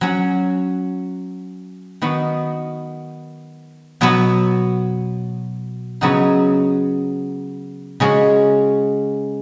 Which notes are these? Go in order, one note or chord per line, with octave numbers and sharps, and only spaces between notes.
F#3 C#4 F#4
D#3 B3 F#4
B2 F#3 B3 F#4
C#3 F#3 B3 D#4 F#4
C#3 G#3 C#4 F#4